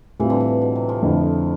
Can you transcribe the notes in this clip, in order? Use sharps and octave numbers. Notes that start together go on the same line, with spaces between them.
A2 E3 G3 C4 F4
D3
E3
B2
C3
F3
F2 D3 A3 E4